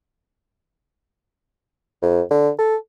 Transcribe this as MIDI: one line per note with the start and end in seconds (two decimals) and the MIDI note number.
2.02 2.21 41
2.31 2.49 50
2.58 2.76 69